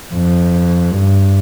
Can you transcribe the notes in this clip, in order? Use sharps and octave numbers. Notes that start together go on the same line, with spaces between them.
F2
G2